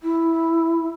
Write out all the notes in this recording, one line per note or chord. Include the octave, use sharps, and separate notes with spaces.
E4